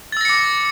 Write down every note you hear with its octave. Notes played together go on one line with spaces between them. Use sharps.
D6 E6 A6 A#6 C#7